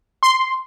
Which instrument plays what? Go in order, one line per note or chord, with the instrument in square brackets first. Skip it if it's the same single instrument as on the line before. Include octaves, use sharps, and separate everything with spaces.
[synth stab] C6